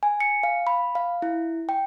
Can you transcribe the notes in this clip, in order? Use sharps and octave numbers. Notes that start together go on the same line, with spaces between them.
G#5
C#7
F5
B5
F5
E4
G5